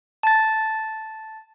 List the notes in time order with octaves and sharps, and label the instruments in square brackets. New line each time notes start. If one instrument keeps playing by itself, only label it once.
[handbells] A5 A6